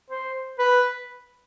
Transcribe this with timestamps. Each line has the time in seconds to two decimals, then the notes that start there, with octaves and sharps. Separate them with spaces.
0.11 C5
0.59 B4